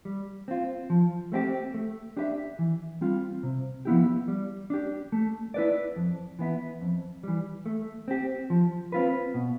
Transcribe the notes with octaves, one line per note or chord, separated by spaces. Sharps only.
G3
C4 F4
F3
A3 C4 E4 G4
A3
D4 G4 B4 E5
E3
G3 C4 F4
C3
F3 B3 E4 G4
G3
D4 G4
A3
E4 B4 D5
F2
E3 B3 E4
F2
E3 G3
A3
C4 G4
F3
C4 F4 B4
B2